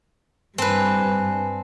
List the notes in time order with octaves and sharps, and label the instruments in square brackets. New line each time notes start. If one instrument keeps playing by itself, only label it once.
[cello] G2 [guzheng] C4 B4 [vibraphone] G#5 A5